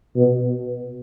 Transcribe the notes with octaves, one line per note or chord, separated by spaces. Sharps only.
B2